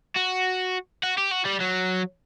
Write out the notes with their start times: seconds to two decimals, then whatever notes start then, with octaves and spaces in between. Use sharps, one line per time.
0.16 F#4
1.03 F#4
1.18 G4
1.32 F#4
1.46 G3
1.61 F#3